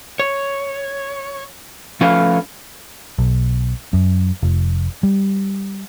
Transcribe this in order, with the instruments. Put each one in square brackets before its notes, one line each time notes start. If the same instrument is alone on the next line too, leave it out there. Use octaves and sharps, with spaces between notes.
[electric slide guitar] C#5
F3 A3 C#4 B4 F5
[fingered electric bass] B1
F#2
F1
G3